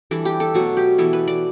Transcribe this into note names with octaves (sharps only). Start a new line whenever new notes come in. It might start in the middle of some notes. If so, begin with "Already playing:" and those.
E3 G3 D4 A4
G4
A4
B2 F#3 A3 F#4
G4
E3 B3 E4 A4
B4
D5